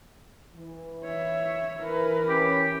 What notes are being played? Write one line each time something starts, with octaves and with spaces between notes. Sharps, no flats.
E3
C#5 E5
E3 A#4 B4
C#4 G4